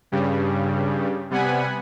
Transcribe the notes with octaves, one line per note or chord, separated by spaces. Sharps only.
G2 C#3 G3
C3 G3 B3 F#5 G#5 B5